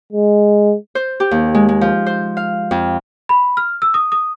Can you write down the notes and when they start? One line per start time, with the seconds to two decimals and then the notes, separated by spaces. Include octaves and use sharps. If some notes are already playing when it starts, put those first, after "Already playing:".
0.13 G#3
0.95 C5
1.20 G4
1.31 D#2
1.55 G#3
1.69 G#3
1.81 F3
2.06 C5
2.37 F5
2.71 F2
3.29 B5
3.57 F6
3.82 E6
3.94 D#6
4.12 D#6